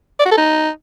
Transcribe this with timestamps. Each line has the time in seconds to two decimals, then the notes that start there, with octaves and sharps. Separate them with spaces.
0.19 D5
0.25 F#4
0.31 A4
0.37 D#4